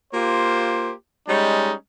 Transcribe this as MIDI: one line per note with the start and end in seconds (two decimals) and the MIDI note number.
0.14 0.92 58
0.14 0.92 65
0.14 0.92 67
0.14 0.92 72
1.29 1.73 55
1.29 1.73 56
1.29 1.73 61
1.29 1.73 63